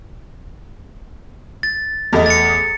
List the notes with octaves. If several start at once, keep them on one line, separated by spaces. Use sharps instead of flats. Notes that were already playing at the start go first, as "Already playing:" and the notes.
A6
E2 A3 D#5
A6 C#7